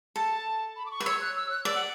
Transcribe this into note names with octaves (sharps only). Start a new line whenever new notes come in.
A4 A5
B5
D6
C#6
B4
C#5 E6
F#6
E6
F#6
D5 E6
F#5